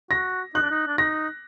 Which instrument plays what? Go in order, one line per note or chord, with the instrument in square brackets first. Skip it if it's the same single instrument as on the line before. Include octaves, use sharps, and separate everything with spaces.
[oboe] F#4 [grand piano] A#6
[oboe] D#4 [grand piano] F#6
[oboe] D4
D#4
D4
[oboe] D#4 [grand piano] A#6